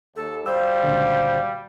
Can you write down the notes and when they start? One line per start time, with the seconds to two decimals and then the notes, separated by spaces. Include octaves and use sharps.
0.16 D#2 A4
0.46 G3 F#4 G4 C5 F5 E6
0.84 C#2 A#2 D3